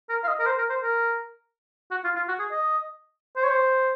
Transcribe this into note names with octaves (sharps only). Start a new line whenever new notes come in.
A#4
F5
D#5
A#4
C5
A#4
C5
A#4
F#4
F4
F4
F#4
G#4
D#5
C5
C#5
C5